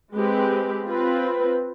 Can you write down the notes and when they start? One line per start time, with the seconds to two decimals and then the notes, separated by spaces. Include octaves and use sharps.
0.13 G#3 C4 G4 B4
0.87 C4 F4 B4